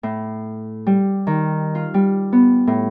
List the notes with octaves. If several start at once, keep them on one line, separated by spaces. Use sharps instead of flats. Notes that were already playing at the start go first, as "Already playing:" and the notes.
A2
G3
D#3
F4
G3
B3
A2